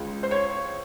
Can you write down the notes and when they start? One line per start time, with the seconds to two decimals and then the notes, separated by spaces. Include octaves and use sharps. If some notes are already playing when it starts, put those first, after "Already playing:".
Already playing: C#2 C#3
0.23 C5
0.31 C#5